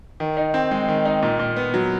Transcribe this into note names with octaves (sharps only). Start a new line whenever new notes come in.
D#3
D#4
C4
G#3
D#3
D#4
A#2
A#2
B3
F#3